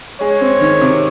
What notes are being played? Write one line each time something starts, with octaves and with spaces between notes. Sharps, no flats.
G#3 C#5
C4
D#3
C3